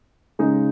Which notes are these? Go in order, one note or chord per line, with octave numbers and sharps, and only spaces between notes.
C#3 G#3 D#4